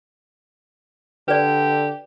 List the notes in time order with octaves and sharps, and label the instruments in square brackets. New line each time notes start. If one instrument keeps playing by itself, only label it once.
[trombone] D3 [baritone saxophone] G4 [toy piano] B4 D5